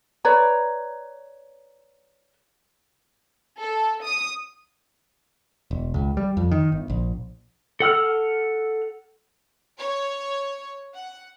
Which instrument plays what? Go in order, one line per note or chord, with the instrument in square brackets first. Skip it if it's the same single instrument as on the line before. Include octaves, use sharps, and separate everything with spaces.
[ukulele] B4 C#5 D5 A#5
[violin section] A4
D#6
[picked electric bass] E1
C#2
G3
F2
D#3
G1
A#1
[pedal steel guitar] A4 F#5 E6 F6
[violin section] C#5
F#5